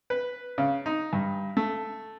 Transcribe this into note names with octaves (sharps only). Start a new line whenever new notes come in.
B4
C#3
D#4
G2
A3